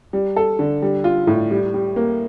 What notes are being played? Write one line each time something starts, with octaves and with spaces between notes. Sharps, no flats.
G3
A4
D3
G3
F4
A2
G3
G3
A#3